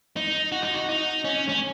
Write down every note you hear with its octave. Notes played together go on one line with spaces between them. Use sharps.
D#4
F#4
D#4
F#4
D#4
C#4
C#4